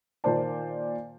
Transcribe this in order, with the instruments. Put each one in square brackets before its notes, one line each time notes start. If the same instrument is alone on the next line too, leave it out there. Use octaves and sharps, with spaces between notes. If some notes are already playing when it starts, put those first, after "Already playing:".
[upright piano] A#2 D#3 A#3 C5 D5 A5